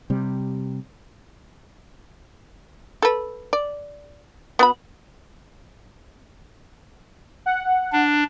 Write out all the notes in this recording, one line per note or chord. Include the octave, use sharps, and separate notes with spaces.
C3 G3
A4 B4
D5
B3 F#4 B5
F#5
D4